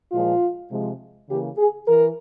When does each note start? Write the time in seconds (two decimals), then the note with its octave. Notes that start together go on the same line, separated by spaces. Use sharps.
0.12 A#2 F3 G#3 F4
0.70 C3 F3 G#3
1.29 C#3 E3 A#3 G4
1.58 G#4
1.87 E3 A#4